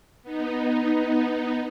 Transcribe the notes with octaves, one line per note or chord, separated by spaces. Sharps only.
B3 D#4